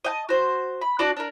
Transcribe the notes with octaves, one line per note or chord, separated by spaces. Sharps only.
D#5 G5 A5
F#4 C5
B5
D4 F#4 D5 A5
D4 A#4